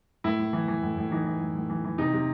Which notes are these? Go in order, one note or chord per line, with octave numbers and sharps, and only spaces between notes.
A2 E4
A2
E3
E3
A2
A2
E3 D#4
E3
A2
A2
E3
E3
C3 D#4
C3